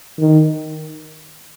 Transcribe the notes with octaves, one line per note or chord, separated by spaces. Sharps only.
D#3